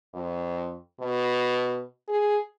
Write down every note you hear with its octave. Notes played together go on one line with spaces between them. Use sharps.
F2
B2
G#4